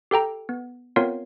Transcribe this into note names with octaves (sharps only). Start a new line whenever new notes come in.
G4 A4 G5 A#5
B3
B3 C4 F4 A#4 C#5 F5